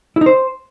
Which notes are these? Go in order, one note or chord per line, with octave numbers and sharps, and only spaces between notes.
E4
D#4
C5